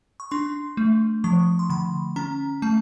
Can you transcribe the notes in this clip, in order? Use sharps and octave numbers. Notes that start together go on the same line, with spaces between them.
C#6
D4 C6
A3
F3 C#6
C6
D3 B5
C#4 A#5
A3 A5